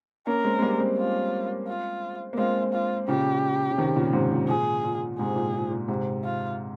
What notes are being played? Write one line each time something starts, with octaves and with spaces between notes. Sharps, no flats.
A#3 C#4 A#4
G#3 C4
G#3
G3 A#3
G#3 C4
F4
F4
A#3
G#3 C4 F4
F4
A#2 C#3 G4
C#3
C3 D#3
A#2 C#3
G#2 C3
A#2
A#2 G#4
A#2
G#2 C3 G#4
A#2
A#2
A#2
G#2 C3
F4